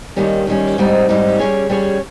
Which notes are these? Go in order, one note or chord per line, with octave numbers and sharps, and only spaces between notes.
D#2 D#3 G3 C#4
D#2 D#3 G3 C#4
G#2 G3 C4 D#4
G#2 G3 C4 D#4
G3 C#4 G#4 C#5
G3 C#4 G#4 C#5